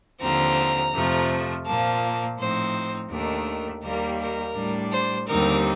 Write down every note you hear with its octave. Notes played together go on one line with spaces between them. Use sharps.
D#2 D3 F3 C4 A#5
F2 C3 F3 A3
A#2 F3 A#3 A5
A2 F3 C4 D#4 C5
D#2 D#3 A3 D4 A#4
D#2 D#3 G3 A#3 A#4
A#4
A2 G3 D4
C5
D#2 D3 G3 C4 D#4 A#4